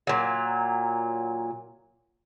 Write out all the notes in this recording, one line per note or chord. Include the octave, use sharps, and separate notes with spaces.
A#2 F#3